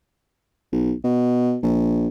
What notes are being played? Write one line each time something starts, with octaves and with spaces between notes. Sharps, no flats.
B1
B2
A#1